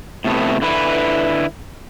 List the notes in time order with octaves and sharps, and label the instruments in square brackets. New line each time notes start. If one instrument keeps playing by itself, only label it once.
[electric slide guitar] A2 C3 A3 B3
D3 E4 B4